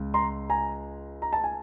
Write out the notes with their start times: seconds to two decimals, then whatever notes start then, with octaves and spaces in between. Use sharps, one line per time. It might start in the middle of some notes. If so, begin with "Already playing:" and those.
Already playing: C#2
0.14 A#5 C6
0.50 G#5 A#5
1.22 A#5
1.33 A5
1.44 G#5